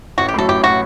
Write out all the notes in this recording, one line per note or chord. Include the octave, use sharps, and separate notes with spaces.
A1 F#4
G4
A2 F#3 A4
A1 G4
A2 F#3 F#4